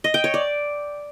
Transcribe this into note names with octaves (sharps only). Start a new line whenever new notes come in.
D#5
G5
C#5
D5